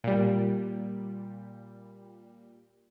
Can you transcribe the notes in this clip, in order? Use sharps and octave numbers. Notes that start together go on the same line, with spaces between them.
A#2 G3